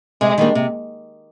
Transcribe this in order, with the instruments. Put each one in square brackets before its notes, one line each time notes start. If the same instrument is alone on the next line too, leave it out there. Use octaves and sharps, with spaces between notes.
[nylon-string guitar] C3 [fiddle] G#3
[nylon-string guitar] D#3 G3 A#3 D4
C3